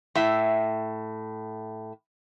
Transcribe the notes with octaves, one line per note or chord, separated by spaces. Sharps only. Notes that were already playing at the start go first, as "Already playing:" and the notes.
A2 E5